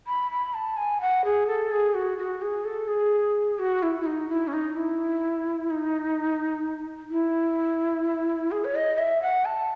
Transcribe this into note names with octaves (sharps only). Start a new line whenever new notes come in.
B5
B5
A5
G#5
F#5
G#4
A4
G#4
F#4
F#4
G#4
A4
G#4
F#4
E4
E4
D#4
E4
C#4
D#4
E4
D#4
E4
G#4
C#5
D#5
E5
F#5
A5